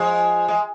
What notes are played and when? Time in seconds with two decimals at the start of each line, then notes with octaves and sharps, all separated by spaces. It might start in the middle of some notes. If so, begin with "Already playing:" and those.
Already playing: F3 G#3
0.48 G#3